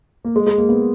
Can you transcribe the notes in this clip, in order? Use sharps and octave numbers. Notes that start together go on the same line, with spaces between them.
A#3
G#3
G#3
A#3
B3